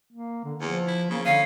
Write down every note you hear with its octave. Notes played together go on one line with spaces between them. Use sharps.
A#3
D3
E2 F3
E4
C#3 A#3
D3 C#4 F5